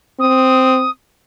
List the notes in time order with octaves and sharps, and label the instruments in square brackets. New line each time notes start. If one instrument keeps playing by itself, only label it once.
[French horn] C4 [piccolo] D#6